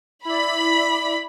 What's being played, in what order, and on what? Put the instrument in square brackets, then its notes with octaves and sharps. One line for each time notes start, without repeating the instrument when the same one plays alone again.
[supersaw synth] E4 D5 [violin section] B5